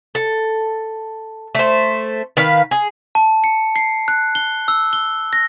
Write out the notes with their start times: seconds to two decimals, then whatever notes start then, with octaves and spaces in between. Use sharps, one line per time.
0.15 A4
1.55 A3 C5
2.37 D#3 B4 F5
2.71 G#4
3.15 A5
3.44 C#7
3.76 C7
4.08 F#6
4.35 G7
4.68 E6
4.93 G7
5.33 A#6